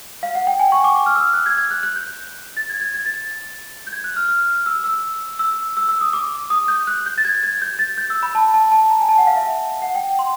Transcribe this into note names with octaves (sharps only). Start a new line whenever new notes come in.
F5
F#5
G5
G#5
C#6
D6
D6
F6
E6
F#6
G#6
G#6
F#6
F#6
G6
A6
G#6
G#6
G#6
A6
G6
G#6
F#6
F6
F6
E6
E6
E6
E6
E6
D#6
D6
D#6
G6
F#6
G6
A6
G#6
G#6
G6
A6
G6
E6
B5
A5
A5
A5
A#5
G#5
A5
F#5
F5
E5
F#5
G5
C6